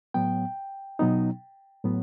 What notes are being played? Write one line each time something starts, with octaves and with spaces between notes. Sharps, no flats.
A2 F#3 B3 G5
B2 F#3 B3 D#4
A2 F#3 B3